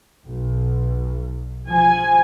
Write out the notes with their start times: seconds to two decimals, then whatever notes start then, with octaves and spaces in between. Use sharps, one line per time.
0.25 B1
1.69 F3 G#5